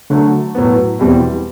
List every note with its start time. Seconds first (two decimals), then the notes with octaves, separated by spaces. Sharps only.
0.10 D3 F#3 A3
0.55 A2 F#3 B3
0.99 E2 B2 G3 C4 E4